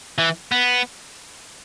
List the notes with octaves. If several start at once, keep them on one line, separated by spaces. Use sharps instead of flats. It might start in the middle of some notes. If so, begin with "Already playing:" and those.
E3
B3